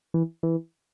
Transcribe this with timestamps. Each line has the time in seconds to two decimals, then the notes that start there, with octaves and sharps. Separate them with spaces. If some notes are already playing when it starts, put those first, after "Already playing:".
0.14 E3
0.43 E3